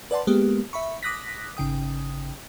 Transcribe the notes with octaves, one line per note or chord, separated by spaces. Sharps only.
B4 D5 F#5 A5 C6
G#3 A#3 B3 G4
E5 B5 C#6
D6 D#6 F#6 A#6 B6
G#1 C#3 G5 D#6